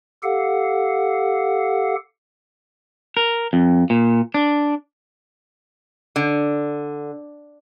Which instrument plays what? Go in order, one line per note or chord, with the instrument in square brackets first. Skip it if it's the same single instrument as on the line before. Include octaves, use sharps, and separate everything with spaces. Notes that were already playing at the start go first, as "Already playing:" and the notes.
[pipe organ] G4 A4 F5 F#5
[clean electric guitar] A#4
F2
A#2
D4
[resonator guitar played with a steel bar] D3